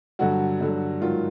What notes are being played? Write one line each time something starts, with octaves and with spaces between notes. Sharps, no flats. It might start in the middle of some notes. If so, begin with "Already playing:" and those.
G2 D3 F#3 F#4
G2 D3 F#3
G#2 D#3 F#3 F4